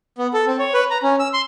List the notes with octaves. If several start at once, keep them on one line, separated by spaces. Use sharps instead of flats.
B3
A4
C4
C#5
B4
A#5
C#4
E6
C6